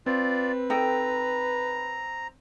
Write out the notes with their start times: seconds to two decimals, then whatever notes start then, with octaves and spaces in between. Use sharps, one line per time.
0.06 C4 F4 B4 D5
0.70 D#4 A4 G5 A#5